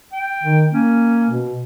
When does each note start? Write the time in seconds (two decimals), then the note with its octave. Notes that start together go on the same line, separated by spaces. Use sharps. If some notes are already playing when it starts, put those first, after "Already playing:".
0.13 G5
0.43 D#3
0.73 A#3 C#4
1.30 B2